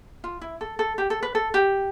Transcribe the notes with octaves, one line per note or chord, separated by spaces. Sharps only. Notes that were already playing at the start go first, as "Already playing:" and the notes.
F4
E4
A4
A4
G4
A4
B4
A4
G4